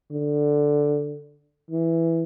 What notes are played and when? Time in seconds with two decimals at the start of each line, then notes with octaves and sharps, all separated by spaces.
0.11 D3
1.71 E3